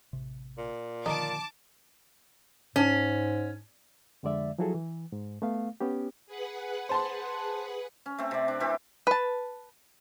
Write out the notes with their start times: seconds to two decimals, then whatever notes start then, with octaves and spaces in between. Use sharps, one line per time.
0.13 A1 C3
0.58 A#2
1.06 D3 D#3 F3 D#4 A5 D6
2.76 G#2 C#4
4.23 F2 D3 G#3 D5 E5
4.58 F3 F#3 E4 F#4 G#4 A4
4.74 E3
5.12 G#2
5.42 A3 B3 F5
5.80 B3 C#4 G4
6.27 G#4 B4 F#5
6.89 C5 A5 C6
8.06 C#4
8.18 A3 C4
8.31 C3 D5
8.48 D4
8.60 E3 C4 G4 B5
9.07 B4 A5